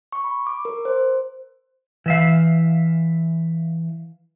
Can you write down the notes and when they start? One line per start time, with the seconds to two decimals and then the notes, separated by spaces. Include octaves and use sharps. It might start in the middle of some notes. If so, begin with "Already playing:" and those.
0.12 C#6
0.24 B5
0.47 D6
0.65 A#4
0.85 C5
2.06 E3 E5 F5